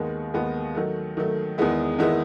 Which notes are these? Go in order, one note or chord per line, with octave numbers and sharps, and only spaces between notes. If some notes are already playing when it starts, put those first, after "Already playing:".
Already playing: D#2 D#3 G#3 B3
D#2 D#3 G#3 B3
D#3 F#3 A3
D#3 F#3 A3
E2 D#3 G#3 B3 E4
E2 D#3 G#3 B3 E4